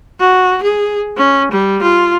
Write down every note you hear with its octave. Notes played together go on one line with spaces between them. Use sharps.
F#4
G#4
C#4
G3
F4